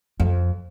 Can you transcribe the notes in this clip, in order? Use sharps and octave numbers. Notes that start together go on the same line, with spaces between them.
F2